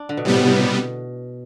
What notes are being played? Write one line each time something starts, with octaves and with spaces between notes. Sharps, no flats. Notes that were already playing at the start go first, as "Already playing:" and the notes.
Already playing: D4
D3
B2
A2 C3 G3 B3
B2
A2
B2